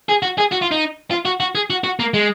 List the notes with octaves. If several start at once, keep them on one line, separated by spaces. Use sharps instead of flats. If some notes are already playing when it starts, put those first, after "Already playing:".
G#4
F#4
G#4
F#4
F4
D#4
F4
F#4
F#4
G#4
F#4
F#4
A#3
G#3